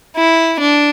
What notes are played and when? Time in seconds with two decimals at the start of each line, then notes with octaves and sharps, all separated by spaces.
0.16 E4
0.60 D4